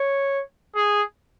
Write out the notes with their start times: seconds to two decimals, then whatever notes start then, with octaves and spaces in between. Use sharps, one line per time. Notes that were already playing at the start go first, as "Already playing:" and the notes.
Already playing: C#5
0.76 G#4